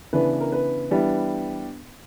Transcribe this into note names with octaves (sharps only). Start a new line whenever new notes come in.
C#3 E3 B3 D4 B4
A#4
B4
E3 G3 B3 D4